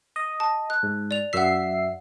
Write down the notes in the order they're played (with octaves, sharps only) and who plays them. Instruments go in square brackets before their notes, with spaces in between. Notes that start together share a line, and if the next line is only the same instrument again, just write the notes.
[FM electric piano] D#5
[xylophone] A5
F#6
[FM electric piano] G#2
[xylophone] D5 F7
[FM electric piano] F#2 E5 C7 [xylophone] F#5 B6